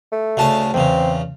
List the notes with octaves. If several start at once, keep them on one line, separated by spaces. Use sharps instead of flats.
A3
D2 C#3 A5
E2 C#3 C4